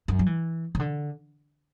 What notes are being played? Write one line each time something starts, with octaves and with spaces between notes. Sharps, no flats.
F#2
F#3
E3
C#3
D3